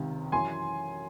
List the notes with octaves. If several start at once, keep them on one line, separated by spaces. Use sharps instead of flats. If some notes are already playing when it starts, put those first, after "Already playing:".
Already playing: C#2 C3 D#3
F#2 E3 G#5 C6